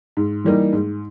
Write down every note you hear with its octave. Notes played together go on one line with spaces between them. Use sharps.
G#2
E3 G3 A#3 D#4
G#2